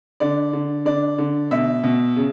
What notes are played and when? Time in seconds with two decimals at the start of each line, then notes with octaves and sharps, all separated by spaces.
0.20 D3 D5
0.53 D3
0.85 D3 D5
1.18 D3
1.51 B2 E5
1.84 B2
2.16 C#3